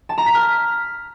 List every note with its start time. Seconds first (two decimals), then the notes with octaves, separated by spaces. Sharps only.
0.09 A5
0.18 A#5
0.26 B6
0.34 F6